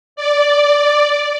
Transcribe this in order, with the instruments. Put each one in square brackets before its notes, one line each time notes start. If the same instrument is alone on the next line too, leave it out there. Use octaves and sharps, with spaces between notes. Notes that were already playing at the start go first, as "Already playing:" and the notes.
[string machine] D5